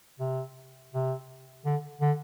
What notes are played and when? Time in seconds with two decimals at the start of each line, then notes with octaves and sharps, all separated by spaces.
0.20 C3
0.93 C3
1.65 D3
2.01 D3